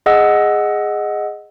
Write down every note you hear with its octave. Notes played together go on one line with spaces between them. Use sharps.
G#4 D#5 F#5 E6